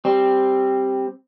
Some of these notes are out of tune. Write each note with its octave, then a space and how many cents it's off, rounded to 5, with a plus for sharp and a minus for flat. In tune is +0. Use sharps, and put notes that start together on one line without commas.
G3 +0 C4 +5